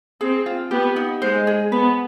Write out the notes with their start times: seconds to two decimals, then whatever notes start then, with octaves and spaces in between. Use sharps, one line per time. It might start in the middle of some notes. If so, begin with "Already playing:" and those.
0.21 C4 G#4
0.46 F4
0.71 B3 G4
0.96 D#4
1.21 G#3 C5
1.47 G#4
1.72 B3 B4